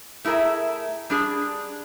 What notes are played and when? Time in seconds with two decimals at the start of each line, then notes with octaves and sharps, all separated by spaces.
0.25 A3 E4 G#4 A#4 E5
1.10 G3 D4 G#4